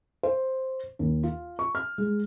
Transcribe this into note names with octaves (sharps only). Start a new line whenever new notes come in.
C5
D#2
F4
C#6
F6
G#3